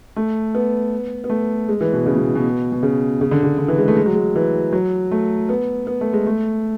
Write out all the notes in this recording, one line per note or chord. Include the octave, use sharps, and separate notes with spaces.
A3
B3
B3
A3
G#3
E3
B2
C#3
B2
B2
B2
C#3
C#3
D3
C#3
D3
E3
G#3
A3
G#3
F#3
G#3
E3
F#3
A3
B3
B3
A3
G#3
A3